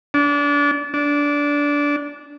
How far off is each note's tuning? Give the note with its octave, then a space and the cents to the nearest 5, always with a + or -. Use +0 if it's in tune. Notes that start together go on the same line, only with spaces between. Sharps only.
D4 -30
D4 -20